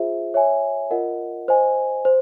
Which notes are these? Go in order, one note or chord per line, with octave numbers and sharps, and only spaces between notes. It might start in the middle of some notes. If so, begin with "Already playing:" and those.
Already playing: F4 G#4 C5 E5
C#5 E5 G#5
F4 A#4 D#5 F#5
C5 D#5 G#5
C5